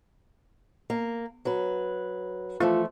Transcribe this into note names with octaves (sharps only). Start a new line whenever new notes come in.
A#3
F#3 B4
E3 F3 A3 F4